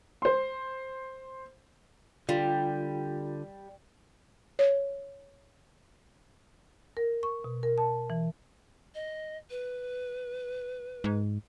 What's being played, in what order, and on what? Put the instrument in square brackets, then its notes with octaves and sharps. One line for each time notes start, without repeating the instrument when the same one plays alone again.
[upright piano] C5 C6
[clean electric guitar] D3 [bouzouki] G3 [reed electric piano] F4
[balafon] C#5
[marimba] A#4
C#6
B2
A#4
A5
E3
[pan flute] D#5
B4
[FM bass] G#2